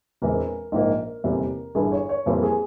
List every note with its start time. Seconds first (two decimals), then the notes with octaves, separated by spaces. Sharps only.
0.22 E1 E2 E3 G#3 C4 A#4
0.72 A#1 G#2 F3 A#3
1.24 F1 E2 C3 G3 A#3
1.75 G1 G2 E3 G#4
1.92 C#5
2.09 C#5
2.26 F2 E3 G3 A#3 C5
2.43 G#4